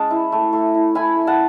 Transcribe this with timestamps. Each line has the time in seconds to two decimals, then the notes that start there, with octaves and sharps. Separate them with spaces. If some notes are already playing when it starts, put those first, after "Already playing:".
Already playing: G#3 C#4 A5
0.11 E4
0.32 A3
0.53 A3
0.75 E4
0.95 E4 G#5 B5
1.16 A3
1.27 F#5 A5